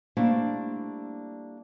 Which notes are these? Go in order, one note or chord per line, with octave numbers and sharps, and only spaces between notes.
G3 A3 A#3 C4 D4 E4